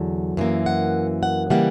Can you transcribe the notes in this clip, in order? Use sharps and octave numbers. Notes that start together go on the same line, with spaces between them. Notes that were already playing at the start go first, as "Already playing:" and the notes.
Already playing: E2 D3 F#3
F#2 E3 A#3
F#5
F#5
C#3 E3 G3 A#3 F#5